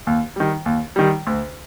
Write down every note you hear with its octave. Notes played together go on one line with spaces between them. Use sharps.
D#2
D#3 G3
D#2
D#3 G3
D2